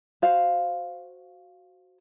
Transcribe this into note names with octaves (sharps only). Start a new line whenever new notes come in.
F#4 C5 F5